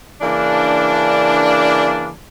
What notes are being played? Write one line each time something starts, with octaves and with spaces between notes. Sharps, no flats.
C#3 E3 A#3 D4